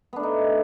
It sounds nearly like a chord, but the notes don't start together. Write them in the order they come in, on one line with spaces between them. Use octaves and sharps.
B3 D4 A3 D#4